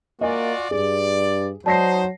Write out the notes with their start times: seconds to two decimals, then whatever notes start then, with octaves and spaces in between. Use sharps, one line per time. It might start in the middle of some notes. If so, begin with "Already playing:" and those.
0.21 A#3 F4 F#4 D5 D#5 G#5
0.71 G2 G#4 D5
1.66 F#3 D#4 C5 D5 A5 A#6 C7